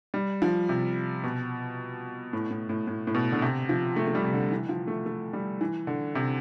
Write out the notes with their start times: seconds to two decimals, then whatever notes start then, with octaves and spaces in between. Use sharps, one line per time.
0.14 G3
0.42 F3
0.69 C3
1.23 B2
2.33 A2
2.50 A2
2.69 A2
2.87 A2
3.07 A2
3.15 B2
3.32 D3
3.42 C3
3.69 F3
3.96 A3
4.07 A3
4.15 G3
4.24 C3
4.33 D3
4.52 E3
4.69 F3
4.87 A3
5.06 A3
5.33 G3
5.61 E3
5.87 D3
6.15 C3